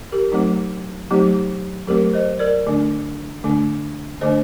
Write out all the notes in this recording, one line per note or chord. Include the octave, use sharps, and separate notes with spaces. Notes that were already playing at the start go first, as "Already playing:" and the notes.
G4 A#4
F#3 A3 C4 D#4
F#3 A3 C4 D#4 G4
F#3 A3 C4 G4 A#4
C5 D#5
A#4 D5
D3 A3 D4
D3 A3 D4
D3 A3 D4 C5 D#5